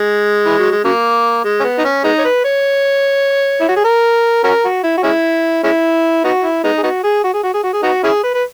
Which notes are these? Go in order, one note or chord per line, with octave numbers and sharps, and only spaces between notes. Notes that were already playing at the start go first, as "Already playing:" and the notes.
Already playing: G#3
E3
F#3
G#3
C#3 F#3 A#3
G#3
C#4
B3
D#4
C#4
G#3 B3 D#4
C#5
B4
C#5
E4
F#4
G#4
A#4
C#4 F#4 A#4
F#4
E4
F#4
G#3 C#4 E4
G#3 C#4 E4
B3 D#4 F#4
E4
G#3 B3 D#4
G#4
B3 D#4 F#4
G#4
F#4
G#4
F#4
G#4
F#4
G#4
B3 D#4 F#4
C#4 E4 G#4
B4
B4